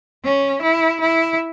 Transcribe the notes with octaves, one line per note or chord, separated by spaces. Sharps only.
C#4
E4
E4